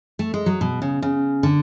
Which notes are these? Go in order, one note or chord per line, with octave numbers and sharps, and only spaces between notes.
A3
G#3
F#3
B2
C#3
C#3
D3